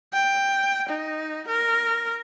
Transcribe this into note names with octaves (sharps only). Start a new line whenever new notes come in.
G5
D#4
A#4